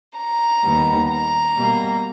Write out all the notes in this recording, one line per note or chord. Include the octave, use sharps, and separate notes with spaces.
A#5
D#2 D#3 G3 B3
A#5
B2 G3 A#3